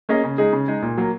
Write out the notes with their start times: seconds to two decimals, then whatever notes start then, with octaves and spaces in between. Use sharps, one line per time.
0.09 A#3 C#4 G#4 D#5
0.24 C#3
0.38 G#3 D#4 G#4
0.53 C#3
0.68 G#3 D#4 G#4
0.82 A#2
0.98 F#3 A#3